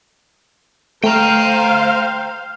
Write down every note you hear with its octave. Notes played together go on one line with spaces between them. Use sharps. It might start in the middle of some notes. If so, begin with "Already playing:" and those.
A3 C5 F5 G5 A#5